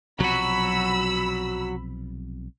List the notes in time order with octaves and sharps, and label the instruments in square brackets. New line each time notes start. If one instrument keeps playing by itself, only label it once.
[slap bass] B1 C3 F3 [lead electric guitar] F#3 F#4 [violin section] B5 E6